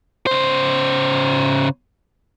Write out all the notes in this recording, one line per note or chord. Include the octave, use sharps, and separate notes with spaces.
C#3 C5